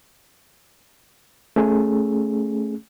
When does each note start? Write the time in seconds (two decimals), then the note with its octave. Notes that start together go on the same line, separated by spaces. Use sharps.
1.56 A3 C#4 G#4